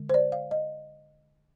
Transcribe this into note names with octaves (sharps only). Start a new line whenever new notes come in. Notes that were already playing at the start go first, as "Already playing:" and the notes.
Already playing: D3 G#3
C5
D5
F5
D#5